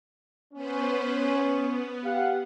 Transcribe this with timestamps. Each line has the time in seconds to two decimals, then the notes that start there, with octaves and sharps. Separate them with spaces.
0.53 B3 C#4 B4 C5
1.31 B3
2.04 G4 F5 F#5